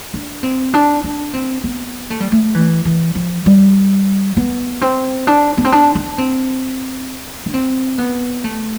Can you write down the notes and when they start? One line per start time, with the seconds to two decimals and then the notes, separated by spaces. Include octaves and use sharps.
0.14 D4
0.43 C4
0.74 D4
1.04 D4
1.34 C4
1.64 B3
2.10 A3
2.20 G3
2.32 A3
2.55 E3
2.85 E3
3.15 F3
3.46 G3
4.37 B3
4.81 C4
5.27 D4
5.57 B3
5.65 C4
5.72 D4
5.95 D4
6.18 C4
7.46 D4
7.54 C4
7.98 B3
8.44 A3